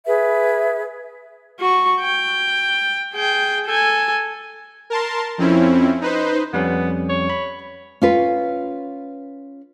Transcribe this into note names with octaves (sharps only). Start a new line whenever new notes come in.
G#4 B4 E5
F#4 C#6
G5
G#4 G5
A4 G#5
A#4 A5 C6
F2 C4 C#4 E4
D#4 B4 C5
F2 G3 B3 C#4
C#5
B5
C#4 F4 B4